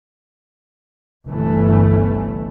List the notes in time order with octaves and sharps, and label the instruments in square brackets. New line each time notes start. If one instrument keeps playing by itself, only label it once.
[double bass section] G1 C2 E3 A3